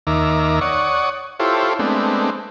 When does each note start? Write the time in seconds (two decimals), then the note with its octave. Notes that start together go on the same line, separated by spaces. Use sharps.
0.07 D#2 D#3 E5 A#5 D6
0.61 C#5 D5 F#5 C#6 D#6
1.40 E4 F4 G4 A4 C5 C#5
1.79 G#3 A3 B3 C4 D4